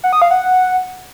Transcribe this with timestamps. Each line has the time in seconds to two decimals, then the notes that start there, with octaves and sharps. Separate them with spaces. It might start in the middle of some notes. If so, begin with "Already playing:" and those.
0.04 F#5
0.13 D#6
0.22 F5
0.31 F#5